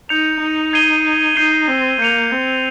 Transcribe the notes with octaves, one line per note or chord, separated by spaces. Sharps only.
D#4 G6 C#7 F7
D#4
G#6 C7 D#7 G7
D#4 G6 C7 D#7 G7
C4
A#3 G6 C#7 F7
C4